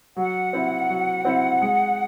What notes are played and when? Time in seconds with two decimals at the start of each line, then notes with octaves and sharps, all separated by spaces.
0.16 F#3 F#5
0.53 C4 E4 C5 E5
0.89 F#3
1.25 C4 E4 C5 E5
1.61 G#3